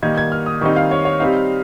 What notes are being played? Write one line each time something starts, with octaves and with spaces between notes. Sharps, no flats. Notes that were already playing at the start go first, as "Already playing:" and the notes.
D#3 G3 A#3 D#4 G#6
G#6
F6
D#6
D#3 G3 C4 D#4 C#6
F5
C#5
C#5
G3 C4 D#4 F5